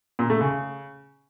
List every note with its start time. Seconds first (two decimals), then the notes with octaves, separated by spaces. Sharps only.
0.19 A#2
0.30 A3
0.41 C#3